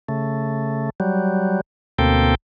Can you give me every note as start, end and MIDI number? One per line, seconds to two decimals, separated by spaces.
0.09 0.90 49
0.09 0.90 57
1.00 1.61 54
1.00 1.61 55
1.99 2.35 38
1.99 2.35 47
1.99 2.35 58
1.99 2.35 60
1.99 2.35 69
1.99 2.35 79